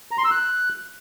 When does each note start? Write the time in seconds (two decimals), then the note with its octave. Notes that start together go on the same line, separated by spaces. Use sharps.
0.11 A#5
0.18 C6
0.24 E6
0.31 F#6